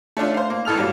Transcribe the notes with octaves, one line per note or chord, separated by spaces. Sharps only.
A3 C#4 D4 F4
C5 F5
A#3
A1 A2 A4 F6 F7
G#2 F#3 G3 A#3